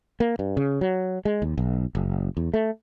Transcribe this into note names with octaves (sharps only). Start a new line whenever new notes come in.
A#3
G2
C#3
F#3
G#3
D#2
B1
F#1
E2
A3